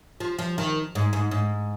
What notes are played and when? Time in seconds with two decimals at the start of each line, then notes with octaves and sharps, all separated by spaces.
0.20 F3
0.39 F3
0.58 D#3
0.95 G#2
1.13 G#2
1.31 G#2